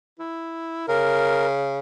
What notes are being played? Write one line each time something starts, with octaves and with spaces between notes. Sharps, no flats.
E4
C#3 A#4